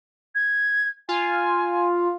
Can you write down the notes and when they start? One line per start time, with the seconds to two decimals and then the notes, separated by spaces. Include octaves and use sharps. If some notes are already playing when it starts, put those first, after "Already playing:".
0.35 G#6
1.09 F4 G#5